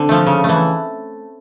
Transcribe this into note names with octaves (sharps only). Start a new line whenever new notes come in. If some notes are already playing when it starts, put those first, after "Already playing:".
Already playing: D3 C4
F3 A3
C#3
E3 A3